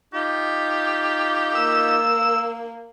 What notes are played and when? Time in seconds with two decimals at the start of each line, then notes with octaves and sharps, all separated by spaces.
0.14 D#4 F4 G4
1.55 A#3 E6